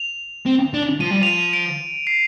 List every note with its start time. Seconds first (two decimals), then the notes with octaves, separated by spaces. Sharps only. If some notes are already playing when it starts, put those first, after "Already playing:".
Already playing: F7
0.46 C4
0.74 D4
1.01 F3 D#7
1.11 G3
1.21 F3 F7
1.27 D#7
1.53 D7
2.07 C7